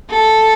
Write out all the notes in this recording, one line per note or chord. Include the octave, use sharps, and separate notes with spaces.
A4